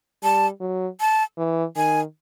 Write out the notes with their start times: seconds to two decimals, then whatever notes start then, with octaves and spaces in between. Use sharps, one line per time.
0.23 G3 A5
0.61 F#3
1.00 A5
1.38 E3
1.76 D#3 G#5